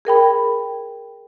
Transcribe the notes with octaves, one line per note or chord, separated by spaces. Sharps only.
G#4 A#4 G5 B5